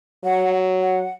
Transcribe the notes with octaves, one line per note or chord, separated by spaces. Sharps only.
F#3 F#5
F#5